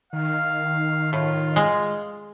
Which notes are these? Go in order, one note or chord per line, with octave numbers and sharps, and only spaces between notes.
D#3 F5
A2 F4
G#3